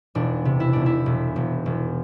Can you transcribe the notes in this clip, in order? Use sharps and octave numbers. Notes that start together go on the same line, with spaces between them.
E1 D4
C3
E4
E1 D4
E4
E1
E1
E1